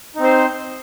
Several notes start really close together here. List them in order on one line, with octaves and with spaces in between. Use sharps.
D#4 C4 C5